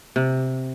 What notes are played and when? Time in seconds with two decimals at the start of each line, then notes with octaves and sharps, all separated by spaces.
0.16 C3